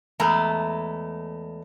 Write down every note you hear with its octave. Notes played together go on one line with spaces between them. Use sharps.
E2 G#3 A3 A#5